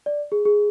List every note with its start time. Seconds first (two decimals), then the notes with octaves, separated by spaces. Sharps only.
0.06 D5
0.32 G#4
0.45 G#4